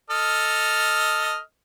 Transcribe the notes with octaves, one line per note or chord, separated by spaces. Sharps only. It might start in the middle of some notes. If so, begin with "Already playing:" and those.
A4 D#5 F6